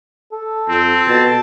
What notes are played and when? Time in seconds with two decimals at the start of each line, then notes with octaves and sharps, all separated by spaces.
0.32 A4
0.69 F2 C4
1.07 B2 A5